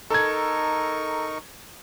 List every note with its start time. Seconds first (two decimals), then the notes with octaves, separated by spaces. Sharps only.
0.10 D#4 A4 A#4 C#6 G#6